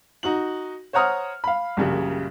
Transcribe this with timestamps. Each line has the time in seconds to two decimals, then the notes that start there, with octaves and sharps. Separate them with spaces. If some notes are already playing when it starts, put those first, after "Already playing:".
0.23 D#4 F#4 F#7
0.93 C5 C#5 F#5 A#5 D#6 F6
1.44 F5 B5
1.77 A#1 F#2 C#3 G3